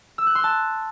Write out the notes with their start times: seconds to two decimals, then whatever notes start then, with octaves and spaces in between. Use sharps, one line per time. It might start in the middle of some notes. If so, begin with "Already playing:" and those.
0.18 E6
0.27 F#6
0.35 C6
0.44 A5